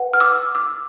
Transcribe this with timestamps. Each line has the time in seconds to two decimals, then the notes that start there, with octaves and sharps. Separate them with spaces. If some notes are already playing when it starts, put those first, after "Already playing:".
Already playing: B4 F#5
0.14 F6
0.20 D6 E6
0.55 D6 E6